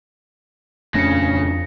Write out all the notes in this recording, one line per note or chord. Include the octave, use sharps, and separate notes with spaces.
D#1 F2 C#3 A3 D4 A#6 C#7